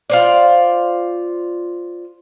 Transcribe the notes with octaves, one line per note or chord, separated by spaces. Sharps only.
F4 C5 D5